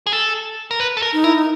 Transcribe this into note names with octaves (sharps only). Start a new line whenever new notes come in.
G#4
A4
A#4
B4
A4
A#4
D#4
E4 A#4
D#4